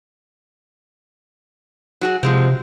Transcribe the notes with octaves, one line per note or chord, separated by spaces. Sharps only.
F#3 F#4 G#4
C3 F3 G#3 C4